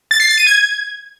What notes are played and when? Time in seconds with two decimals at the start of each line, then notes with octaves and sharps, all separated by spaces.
0.11 A6
0.20 C7
0.29 A6
0.38 D#7
0.47 G#6